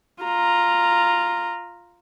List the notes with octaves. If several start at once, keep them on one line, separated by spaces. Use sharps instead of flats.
F4 A#5